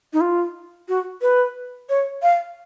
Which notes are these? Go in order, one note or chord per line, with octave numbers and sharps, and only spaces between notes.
D#4
F4
F#4
B4
C#5
F5